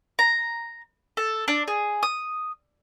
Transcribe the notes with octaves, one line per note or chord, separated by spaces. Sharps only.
A#5
A4
D4
G#4
D#6